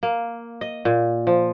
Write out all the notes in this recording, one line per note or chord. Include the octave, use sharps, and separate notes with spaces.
A#3
D#5
A#2
F3